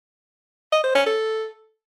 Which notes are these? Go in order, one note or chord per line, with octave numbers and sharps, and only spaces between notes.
D#5
C5
C#4
A4